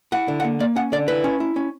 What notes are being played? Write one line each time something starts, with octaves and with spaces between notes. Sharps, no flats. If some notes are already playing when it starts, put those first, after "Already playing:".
E4 F#5
D3
F#5
A#3
A#3 D5
C#4 F#5
D3 D5
E4 B4
C#4
E4
C#4